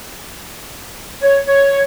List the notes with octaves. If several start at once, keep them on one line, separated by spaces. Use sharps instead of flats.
C#5
C#5